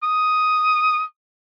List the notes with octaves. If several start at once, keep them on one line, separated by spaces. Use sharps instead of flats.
D#6